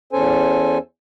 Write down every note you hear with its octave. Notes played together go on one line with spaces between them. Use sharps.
E2 C#4 A4 C5 G#5